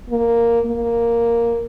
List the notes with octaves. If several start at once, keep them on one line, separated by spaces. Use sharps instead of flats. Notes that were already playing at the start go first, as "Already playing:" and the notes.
A#3
A#3